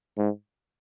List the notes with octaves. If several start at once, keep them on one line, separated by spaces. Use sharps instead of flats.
G#2